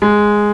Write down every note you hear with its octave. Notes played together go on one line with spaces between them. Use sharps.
G#3